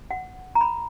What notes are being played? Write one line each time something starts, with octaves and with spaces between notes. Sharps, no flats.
F#5
A#5
B5